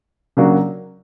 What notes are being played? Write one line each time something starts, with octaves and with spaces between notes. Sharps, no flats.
C#3 F#3 A#3 D4 F#4